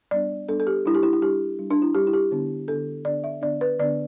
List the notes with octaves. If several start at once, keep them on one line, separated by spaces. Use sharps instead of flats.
G3 B3 D4 D5
G3 B3 D4 A4
A4
G4
G3 D4 E4
G4
E4
E4
G3 D4 G4
G3 D4
D4
E4
G3 D4 G4
E4
G4
D3 B3 D4
D3 B3 D4 A4
D3 B3 D4 D5
E5
D3 B3 D4 D5
B4
D3 B3 D4 D5